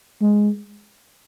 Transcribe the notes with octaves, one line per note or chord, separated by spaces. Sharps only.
G#3